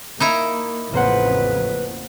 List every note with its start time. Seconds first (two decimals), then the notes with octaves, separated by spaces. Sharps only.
0.20 A#3 D#4 E4 A#5
0.94 A1 F2 C#3 A#3 B4 C5 F#5